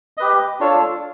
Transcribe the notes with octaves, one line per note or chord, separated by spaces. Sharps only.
G4 B4 D#5
D4 F4 A4 C#5